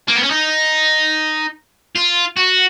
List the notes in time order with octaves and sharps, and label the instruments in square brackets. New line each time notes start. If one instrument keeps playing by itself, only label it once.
[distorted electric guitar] A#3
B3
C#4
D#4
F4
F#4